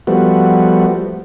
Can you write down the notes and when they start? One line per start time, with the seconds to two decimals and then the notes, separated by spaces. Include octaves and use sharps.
0.07 F3 G3 A3 B3 F#4